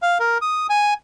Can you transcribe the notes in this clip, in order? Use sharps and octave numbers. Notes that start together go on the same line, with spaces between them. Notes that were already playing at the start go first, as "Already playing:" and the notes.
F5
A#4
D#6
G#5